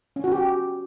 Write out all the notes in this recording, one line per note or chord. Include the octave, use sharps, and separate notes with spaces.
C#4
F#4
G4